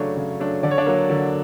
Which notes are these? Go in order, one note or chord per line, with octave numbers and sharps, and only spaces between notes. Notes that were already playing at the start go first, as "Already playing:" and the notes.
Already playing: C#3 F#3 A3 C#4 D4 C#5
C#3
F#3 A3 D4
D3 D5
C#5
D4 D5
F#3 A#3
D3